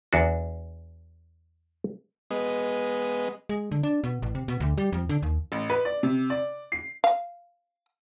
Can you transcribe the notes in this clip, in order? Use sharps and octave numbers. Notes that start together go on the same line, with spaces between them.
E2 D4 F#4
G#3 B3 D#5
G#3
D3
D4
B2
A1
C3
B2
D2
G3
F2
D3
D#2
A1
B4
D5
C3
D5
C7
F5